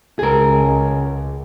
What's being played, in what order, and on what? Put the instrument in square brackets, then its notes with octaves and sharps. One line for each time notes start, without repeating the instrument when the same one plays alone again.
[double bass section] C#2 [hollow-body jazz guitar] G#4 A#4